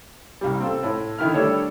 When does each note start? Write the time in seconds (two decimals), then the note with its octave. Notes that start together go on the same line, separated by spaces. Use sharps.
0.41 C2 G3
0.60 C4 F4 A4
0.83 A2
1.18 D3 D#3 E4 B5 F6
1.34 G3 A3 D4 A4 C#5